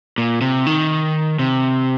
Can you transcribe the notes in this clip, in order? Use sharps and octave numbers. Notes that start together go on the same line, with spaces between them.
A#2
C3
D#3
C3